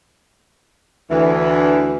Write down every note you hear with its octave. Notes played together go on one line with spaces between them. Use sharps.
D2 E3